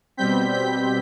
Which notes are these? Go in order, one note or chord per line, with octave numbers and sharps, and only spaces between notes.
B2 G3 C4 G6 B6
G6 B6